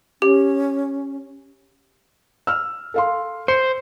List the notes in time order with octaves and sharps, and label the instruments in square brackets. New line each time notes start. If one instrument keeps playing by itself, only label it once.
[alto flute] C#4 [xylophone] G4
[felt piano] E6 F6
A4 F5 C6
[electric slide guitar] C5 [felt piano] C#7